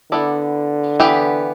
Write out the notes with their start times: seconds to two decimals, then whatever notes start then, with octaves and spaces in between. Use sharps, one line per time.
0.11 D3 B3 E4 A4 D5
1.00 E3 B3 G4 B4